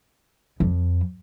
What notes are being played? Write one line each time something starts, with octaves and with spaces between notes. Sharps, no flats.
F2